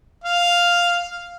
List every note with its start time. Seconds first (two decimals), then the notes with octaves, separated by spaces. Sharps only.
0.24 F5